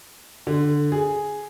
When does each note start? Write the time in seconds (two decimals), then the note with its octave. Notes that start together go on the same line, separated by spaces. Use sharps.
0.47 D3
0.92 G#4